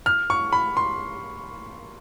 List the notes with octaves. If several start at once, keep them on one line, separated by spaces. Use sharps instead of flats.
F6
C#6
B5
C6